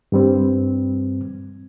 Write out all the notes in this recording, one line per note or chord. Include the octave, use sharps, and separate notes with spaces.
G2 G3 C4